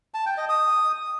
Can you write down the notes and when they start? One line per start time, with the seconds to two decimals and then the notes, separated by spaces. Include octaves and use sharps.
0.14 A5
0.26 G5
0.37 D#5
0.49 D#6